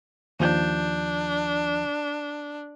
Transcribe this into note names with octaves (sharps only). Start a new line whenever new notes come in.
D#2 F3 D4 G6